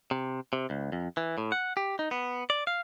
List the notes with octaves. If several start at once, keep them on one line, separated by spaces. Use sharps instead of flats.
C3
C3
C#2
F2
E3
A2
F#5
G4
D#4
B3
D5
F5